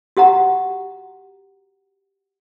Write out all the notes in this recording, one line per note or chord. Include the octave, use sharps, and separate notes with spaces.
F#4 G4 F#5 A#5